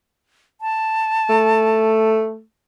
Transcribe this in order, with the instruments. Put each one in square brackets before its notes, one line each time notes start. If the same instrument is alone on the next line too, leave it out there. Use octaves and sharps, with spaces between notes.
[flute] A5
[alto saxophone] A3